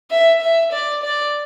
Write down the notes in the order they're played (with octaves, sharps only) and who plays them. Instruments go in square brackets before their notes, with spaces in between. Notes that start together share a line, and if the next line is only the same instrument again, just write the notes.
[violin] E5
E5
D5
D5